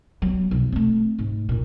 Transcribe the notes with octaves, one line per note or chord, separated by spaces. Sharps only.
F#3 B3
B1 F2
A3 C4
G#2
G2 A#2